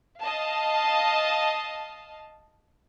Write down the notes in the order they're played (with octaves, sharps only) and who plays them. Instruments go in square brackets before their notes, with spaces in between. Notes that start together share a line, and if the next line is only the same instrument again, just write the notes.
[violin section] D#5 F5 A5